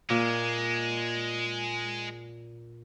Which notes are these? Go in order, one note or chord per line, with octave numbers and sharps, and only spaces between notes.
A#2 G#3